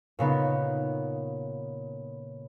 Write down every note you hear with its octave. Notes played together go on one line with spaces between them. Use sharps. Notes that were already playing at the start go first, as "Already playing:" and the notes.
A#2 C#3 B3 D#4